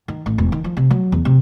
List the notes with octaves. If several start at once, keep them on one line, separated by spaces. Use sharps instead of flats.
D#3
A1
E1
D#3
F3
C3
F#3
E2
C3